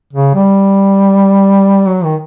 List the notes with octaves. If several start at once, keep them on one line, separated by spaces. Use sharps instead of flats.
C#3
G3
F#3
D#3